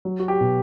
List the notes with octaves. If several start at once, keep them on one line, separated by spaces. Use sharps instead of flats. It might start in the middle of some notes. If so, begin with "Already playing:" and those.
F#3
F#4
G4
B2